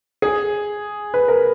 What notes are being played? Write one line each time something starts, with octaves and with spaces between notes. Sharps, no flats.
G#4
B4
A#4